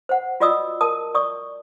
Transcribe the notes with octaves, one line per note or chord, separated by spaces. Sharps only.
C5 F#5
F4 F#4 D5 D#5 D#6 E6
A#4 A5 D#6
D5 C#6 D#6